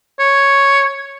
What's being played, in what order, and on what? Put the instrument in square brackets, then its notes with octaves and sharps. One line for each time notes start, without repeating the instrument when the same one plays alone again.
[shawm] C#5